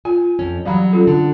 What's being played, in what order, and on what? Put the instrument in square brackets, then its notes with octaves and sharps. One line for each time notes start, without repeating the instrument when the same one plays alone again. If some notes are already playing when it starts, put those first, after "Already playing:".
[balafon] F4 [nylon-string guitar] G#5
[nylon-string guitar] F2 C#4
[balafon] E3 F5 B5 [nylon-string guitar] F#3 G3
[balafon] C#4 F4 A4
[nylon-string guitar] D3